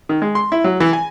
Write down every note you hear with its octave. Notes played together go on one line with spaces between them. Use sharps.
D#3
G#3
C6
E4
F#3
E3
G#5